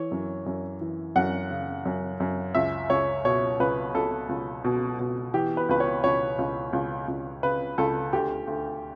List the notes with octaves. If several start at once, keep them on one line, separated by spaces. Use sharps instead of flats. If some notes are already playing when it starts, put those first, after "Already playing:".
Already playing: E3 C#5
F#2
F#2
E3
F#2 F#5
C#3
F#2
F#2
C#2 E5
C#2 C#5
B2 C#5
C#2 B4
C#2 A4
C#2
B2
B2
E3 G4
B4
C#2 B4
C#5
C#2 C#5
C#2
C#2
C#2
C#3 B4
C#2 A4
D2 G4
D2